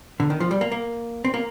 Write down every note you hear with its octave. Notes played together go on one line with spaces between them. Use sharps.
D3
D#3
F3
G3
A#3
A#3
C4
A#3